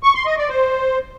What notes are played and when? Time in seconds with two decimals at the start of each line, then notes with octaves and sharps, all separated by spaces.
0.03 C#6
0.15 C6
0.26 D#5
0.38 D5
0.49 C5